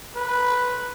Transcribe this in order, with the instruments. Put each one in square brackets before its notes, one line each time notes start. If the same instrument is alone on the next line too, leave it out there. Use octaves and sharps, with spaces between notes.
[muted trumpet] B4